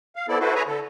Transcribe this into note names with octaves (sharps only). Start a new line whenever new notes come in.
F5
B3 C4 E4 A4 D5
E4 F#4 A4 B4 C5
G#4 B4 C#5 E5 G#5 A#5
D3 A4